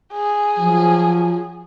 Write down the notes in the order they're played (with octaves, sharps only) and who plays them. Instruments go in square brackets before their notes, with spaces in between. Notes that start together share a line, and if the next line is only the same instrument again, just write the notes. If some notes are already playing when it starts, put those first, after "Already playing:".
[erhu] G#4
[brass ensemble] F3 F#3